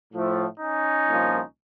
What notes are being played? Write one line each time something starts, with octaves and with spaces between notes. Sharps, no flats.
A2 F3 A3
C#4 D#4
C2 A#2 F3